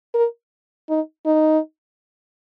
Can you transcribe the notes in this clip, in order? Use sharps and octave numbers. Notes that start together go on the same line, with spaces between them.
A#4
D#4
D#4